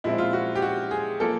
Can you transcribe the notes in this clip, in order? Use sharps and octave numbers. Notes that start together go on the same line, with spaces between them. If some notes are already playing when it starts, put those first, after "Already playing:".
A#2 F3 G#3 C4 E4
F4
F#4
G4
F#4
G#4
F3 A#3 A4